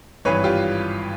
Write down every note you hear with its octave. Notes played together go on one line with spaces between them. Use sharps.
G#1 G2 E3 B4 C#5
F4 G4